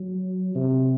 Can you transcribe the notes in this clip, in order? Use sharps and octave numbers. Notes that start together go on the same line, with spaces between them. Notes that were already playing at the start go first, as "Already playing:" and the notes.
Already playing: F#3
C3